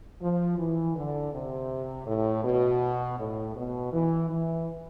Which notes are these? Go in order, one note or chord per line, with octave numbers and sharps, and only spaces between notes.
F3
E3
D3
C3
A2
B2
A2
B2
E3
E3